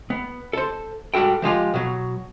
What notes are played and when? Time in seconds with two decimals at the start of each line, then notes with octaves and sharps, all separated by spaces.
0.10 B3
0.53 A4 C5
1.14 G#2 G3 F#4 A4 G5
1.42 F3 G#3 F4 G4
1.74 B2 F#3